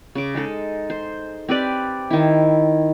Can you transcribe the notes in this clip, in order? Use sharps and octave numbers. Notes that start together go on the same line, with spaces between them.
C#3 D6
G#3 D#4 A4
C5
C4 G4 B4 D5
D#3 E4